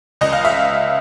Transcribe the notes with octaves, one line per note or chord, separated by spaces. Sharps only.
C#2 D#5
F5
E5